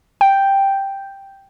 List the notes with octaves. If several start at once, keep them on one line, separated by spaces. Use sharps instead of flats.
G5